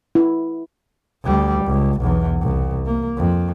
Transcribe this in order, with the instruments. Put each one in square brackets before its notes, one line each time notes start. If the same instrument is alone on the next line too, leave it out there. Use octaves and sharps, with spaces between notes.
[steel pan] E4
[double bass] D2 G3
C#2
B1 E2
C2
A#3
F2